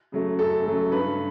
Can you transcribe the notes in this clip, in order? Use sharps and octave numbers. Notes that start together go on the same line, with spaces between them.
C#3 F#3 A3
F#2 A4
C#3 F#3 A3
G2 B4